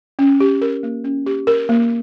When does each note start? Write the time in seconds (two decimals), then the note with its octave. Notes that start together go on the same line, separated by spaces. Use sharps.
0.19 C#4
0.40 G4
0.62 A#4
0.83 A#3
1.04 C#4
1.26 G4
1.47 A#4
1.69 A#3